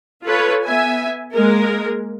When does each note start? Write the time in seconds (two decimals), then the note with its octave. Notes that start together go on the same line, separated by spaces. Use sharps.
0.24 F4 A4 B4 C#5
0.64 B3 E5 G#5
1.32 G#3 A#3 A#4